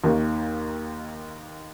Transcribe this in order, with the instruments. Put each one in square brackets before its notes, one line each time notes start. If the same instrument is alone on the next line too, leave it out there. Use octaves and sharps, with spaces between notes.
[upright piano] D#2 D#3 A#3